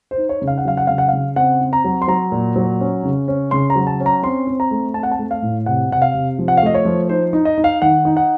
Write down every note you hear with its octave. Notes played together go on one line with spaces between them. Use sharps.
C5
D#4
C#5
C#3
F5
F#5
F#3 F5
F#5
C#3 F5
F#5
C#3 F5
C4 F#5
C4
A#5
F#3
C6
F#3 A#5
A#2
F#3
C#4
C#3
C#4
C#3 C6
A#5
F#3
A5
C#4
A#5
C4 C6
C4
A#5
A3
C4 A5
F#5
A5
A3
F5
A2
C3 F#5
C3 F#5
F5
C3
F3
F#5
F5
A3 D#5
C#5
F3
D#4 C5
D#4
D#5
D#4
F5
D#3 F#5
D#4
F#5